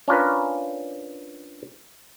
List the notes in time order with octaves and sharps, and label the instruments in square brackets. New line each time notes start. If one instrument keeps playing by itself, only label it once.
[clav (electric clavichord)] C#4 D4 F4 A#4 B4